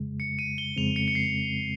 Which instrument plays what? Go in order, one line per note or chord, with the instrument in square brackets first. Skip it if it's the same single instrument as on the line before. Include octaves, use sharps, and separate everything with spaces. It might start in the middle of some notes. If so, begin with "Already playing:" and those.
Already playing: [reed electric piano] F2 C#3 G#3
[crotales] C#7
D#7
G7
[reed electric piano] F2 C#3 G#3 C4 [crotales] F7
[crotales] C#7
C#7
C7